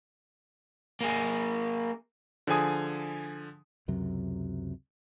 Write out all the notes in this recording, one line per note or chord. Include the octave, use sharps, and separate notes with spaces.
A#3 G#4
D3 F3 G#4 G#5 D#6
C#2 F#2 C3 F#3